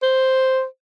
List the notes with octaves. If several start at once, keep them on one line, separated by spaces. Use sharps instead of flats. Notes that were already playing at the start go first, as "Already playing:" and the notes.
C5